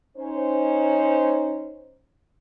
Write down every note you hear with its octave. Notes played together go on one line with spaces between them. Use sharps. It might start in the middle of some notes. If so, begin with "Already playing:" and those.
C#4 D#4 C5